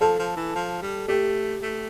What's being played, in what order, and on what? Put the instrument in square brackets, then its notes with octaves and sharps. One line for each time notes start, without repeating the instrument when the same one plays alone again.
[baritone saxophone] F3 [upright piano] A4
[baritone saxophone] F3
E3
F3
G3
[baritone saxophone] A3 [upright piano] G4
[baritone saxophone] A3